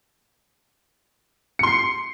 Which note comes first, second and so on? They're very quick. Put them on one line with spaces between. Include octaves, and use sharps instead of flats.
C#7 C6 C7